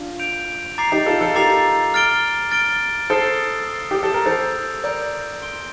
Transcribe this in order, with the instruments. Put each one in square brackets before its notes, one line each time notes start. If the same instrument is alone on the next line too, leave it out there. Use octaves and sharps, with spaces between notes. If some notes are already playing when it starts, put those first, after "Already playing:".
Already playing: [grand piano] D4 F4
[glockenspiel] G6 D7 F7
A#5 D6 A6 C7 F7
[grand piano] D#4 G4
F4 A4
F4 A4
[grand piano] G4 A#4 [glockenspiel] A#5 D6 A6 C7 F7
[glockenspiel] F6 A6 D7 G7
F6 A6 D7 G7
[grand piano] A4 C5 [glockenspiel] D#6 A6 C7 G7
[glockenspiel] D#6 A6 C7 G7
[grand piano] G4
A4
A#4
[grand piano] A4 C5 [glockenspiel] G6 D7 F7
[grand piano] A#4 D5 [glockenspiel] G6 D7 F7
[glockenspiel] C6 G6 D7 G7